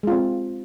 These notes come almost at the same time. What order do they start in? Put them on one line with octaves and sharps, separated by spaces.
G#3 F4 C4